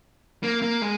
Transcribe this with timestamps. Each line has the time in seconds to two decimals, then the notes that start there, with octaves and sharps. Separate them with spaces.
0.43 A#3
0.62 A#3
0.82 G#3